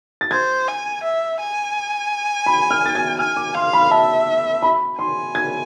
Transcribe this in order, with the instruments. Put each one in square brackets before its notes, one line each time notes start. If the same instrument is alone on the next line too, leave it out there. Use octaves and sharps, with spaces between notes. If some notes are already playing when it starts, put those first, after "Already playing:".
[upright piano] A6
[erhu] C5 [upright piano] G#6
[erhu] G#5
E5
G#5
[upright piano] B5
F6
A6
G#6
[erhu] G#5 [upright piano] F6
[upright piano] D6
[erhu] F5 [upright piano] C6
[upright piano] B5
[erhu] E5 [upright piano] A5
[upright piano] B5
[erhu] G#5 [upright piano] C6
[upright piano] G#6